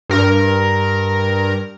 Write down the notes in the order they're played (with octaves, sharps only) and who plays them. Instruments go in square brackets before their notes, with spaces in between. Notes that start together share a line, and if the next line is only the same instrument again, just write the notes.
[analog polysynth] G2 A#4